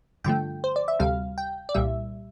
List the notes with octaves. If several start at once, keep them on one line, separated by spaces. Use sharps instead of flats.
G2 D3 F3 A3 G5
C5
D5
E5
D2 C3 G3 F5
G5
D5
C2 A#2 G3 E5